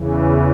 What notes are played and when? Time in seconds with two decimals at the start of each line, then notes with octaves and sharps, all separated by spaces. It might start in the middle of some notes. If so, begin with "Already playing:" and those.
Already playing: E2 C#3 E3